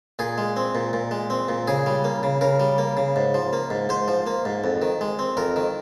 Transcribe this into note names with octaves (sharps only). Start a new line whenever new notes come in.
A#2 G#4
G#3
C4
A#2
A#2
G#3
C4
A#2
C#3 G#4
G3
A#3
C#3
C#3 A#4
G3
A#3
C#3
G#2
F3
A#3
G#2
G#2 C5
F3
A#3
G#2
F2
D#3
G#3
C4
F2 A#4
D#3